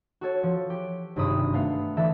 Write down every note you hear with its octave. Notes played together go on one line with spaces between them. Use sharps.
F#4 A4 C#5
F3
G4
G#1 G2 C3 B5 D#6
A3 B3 F5
D3 E3 A4 E5 F#6 B6